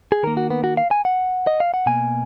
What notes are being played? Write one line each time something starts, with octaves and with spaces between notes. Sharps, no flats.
G#4
D#3 A#3 A#4
F#4
B3
F#4
F5
G#5
F#5
D#5
F5
F#5
B2 A#3 G#5